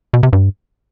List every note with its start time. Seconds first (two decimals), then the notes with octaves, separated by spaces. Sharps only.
0.13 B2
0.23 C3
0.33 G2